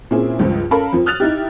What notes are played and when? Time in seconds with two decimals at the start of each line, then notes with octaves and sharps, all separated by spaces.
0.11 A#2 C4 C#4 E4 G#4
0.39 C#2 G2 F3
0.71 C#4 A4 A#4 F5 A5 B5
0.93 F2 F3
1.06 D#6 F6 F#6 A6 F7
1.20 D#4 E4 G4